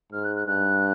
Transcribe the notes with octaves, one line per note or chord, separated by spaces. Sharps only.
G#2 F6
F#6
F#6
G2 F#6